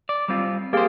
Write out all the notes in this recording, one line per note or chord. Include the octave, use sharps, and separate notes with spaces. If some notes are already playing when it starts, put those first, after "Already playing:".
D5
G3 C4 F4
A#3 G4 G#4 C5 F5